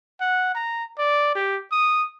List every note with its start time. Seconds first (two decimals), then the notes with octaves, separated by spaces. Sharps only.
0.21 F#5
0.55 A#5
0.98 D5
1.35 G4
1.72 D#6